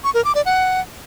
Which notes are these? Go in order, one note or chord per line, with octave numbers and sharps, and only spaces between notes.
C#6
A#4
D6
D5
F#5